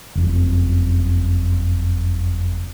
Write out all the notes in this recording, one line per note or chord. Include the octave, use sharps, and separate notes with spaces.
F#1 F2